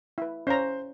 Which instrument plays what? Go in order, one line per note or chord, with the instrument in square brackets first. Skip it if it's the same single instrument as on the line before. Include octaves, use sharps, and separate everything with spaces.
[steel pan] E4 B4
[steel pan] C#4 F5 A#5 [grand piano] C5